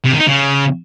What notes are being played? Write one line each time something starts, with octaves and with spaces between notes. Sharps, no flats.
C3
D#3
D#4
C#3